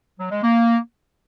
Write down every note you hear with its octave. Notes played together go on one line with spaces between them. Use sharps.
F#3
G#3
A#3